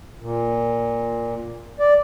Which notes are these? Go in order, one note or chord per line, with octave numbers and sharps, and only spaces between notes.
A#2
D5